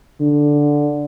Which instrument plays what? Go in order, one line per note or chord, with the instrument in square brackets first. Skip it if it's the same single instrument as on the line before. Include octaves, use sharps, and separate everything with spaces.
[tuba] D3